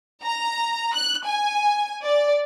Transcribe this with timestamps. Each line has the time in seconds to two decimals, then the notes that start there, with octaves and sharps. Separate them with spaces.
0.24 A#5
0.95 F#6
1.25 G#5
2.03 D5